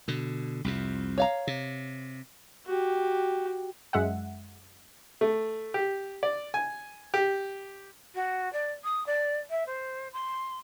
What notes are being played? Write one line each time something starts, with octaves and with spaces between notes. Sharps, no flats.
B2 D3
C2 F2 C3
C#5 F5 A#5
C3
F#4 G4
F#2 G#3 E5 F#5
A3
G4
D5
G#5
G4
F#4
D5
D#6
D5
E5
C5
C6